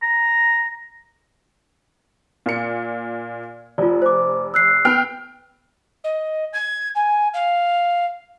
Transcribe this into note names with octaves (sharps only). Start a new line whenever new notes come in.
A#5
A#2 C#7
F1 F4 D5
C5 D6
E6 F#6 C7
B3 G5 F6
D#5
G#6
G#5
F5